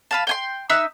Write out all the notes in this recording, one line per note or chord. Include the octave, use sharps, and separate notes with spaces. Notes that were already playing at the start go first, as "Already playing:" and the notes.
B4 F5 A5
G5 G#5 C6
D#4 E5 E6 F#6